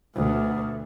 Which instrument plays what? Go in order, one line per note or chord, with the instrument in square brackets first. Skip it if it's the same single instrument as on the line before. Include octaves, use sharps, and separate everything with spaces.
[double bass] D2 B2